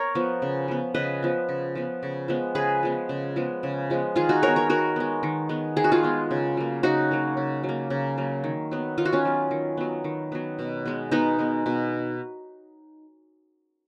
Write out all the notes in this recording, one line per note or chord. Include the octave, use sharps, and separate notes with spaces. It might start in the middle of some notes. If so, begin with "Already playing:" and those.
Already playing: A#4 C#5
F3 B3
C#3
F3 B3
C#3 B4 D#5
F3 B3
C#3
F3 B3
C#3
F3 G#3 B3
C#3 G#4 B4
F3 G#3 B3
C#3
F3 G#3 B3
C#3
F3 G#3 B3
D#3 F4 G#4
D#4 F#4
G#3 B3 A#4 C#5
A#4 C#5
D#3 F#4 A#4
G#3 B3
D#3
G#3 B3
D#3 G#4
F#4
F4 G#4
G#3 B3
C#3
F#3 A#3
C#3 D#4 F#4
F#3 A#3
C#3
F#3
A#3
C#3
F#3 A#3
D#3
F#3 B3
D#3 F4
F#4
C#4 F4
F#3 B3
D#3
F#3 B3
D#3
F#3 B3
B2
G#3 B3
B2 B3 D#4
G#3 B3
B2